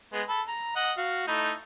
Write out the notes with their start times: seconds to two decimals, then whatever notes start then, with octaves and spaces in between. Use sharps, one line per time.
0.13 G#3 B3
0.28 A4 B5
0.48 A#5
0.76 D#5 F#5
0.98 F#4 F5
1.27 A3 D#4 E4